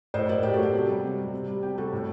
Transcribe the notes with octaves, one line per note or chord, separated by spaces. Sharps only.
A2 C5 D#5
F#3 A#4 D5
A2 G4
F#4 A4
F#3 G4
C3
G3
C3
G3
C3
G3
C3 G4
G3 F#4 A4
A2